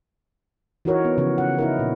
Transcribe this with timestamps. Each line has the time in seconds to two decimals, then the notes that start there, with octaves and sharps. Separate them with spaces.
0.85 E3 D#4 F#4 A#4 C#5
1.05 B3
1.18 C#3 E3 F3
1.38 F#5
1.58 D#4 E4 A#4
1.79 A#2